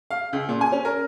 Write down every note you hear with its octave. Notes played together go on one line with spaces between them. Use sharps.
F5
C#2
A#2
G#5
C#4
A#4